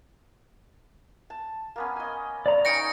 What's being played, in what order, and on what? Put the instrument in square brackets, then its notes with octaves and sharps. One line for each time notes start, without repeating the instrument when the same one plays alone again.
[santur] A5
A#3 B3 C#4
D#5 G#5
[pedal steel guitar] D5 A#5
[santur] C#4 D#4 G5 [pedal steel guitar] C#6 [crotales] A#6 C#7 D7